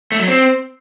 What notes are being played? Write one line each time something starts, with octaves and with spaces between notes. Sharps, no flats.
A3
F#3
C4